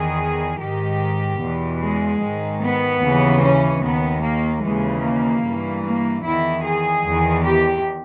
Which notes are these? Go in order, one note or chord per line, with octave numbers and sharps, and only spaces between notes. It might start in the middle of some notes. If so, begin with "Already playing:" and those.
Already playing: E2 D#3 G#4
G#2 D#3 G4
E2 B2
G#3
G#2 D#3
B3
D#2 C#3 E3
C#4
D#2 D#3 B3
A#3
D#2 C#3 E3 G#3
A#3
G2 E3
A#3
E2 D#3 E4
G#4
E2 D#3
G4